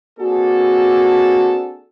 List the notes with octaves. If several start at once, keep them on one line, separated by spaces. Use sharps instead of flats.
A#3 C4 D4 F#4 G#4 A4